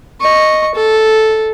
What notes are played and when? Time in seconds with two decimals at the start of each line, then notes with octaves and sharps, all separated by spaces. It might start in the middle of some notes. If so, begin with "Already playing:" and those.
0.21 D#5 C#6
0.75 A4